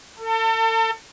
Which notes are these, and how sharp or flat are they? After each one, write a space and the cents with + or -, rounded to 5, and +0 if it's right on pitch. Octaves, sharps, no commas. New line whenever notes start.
A4 +35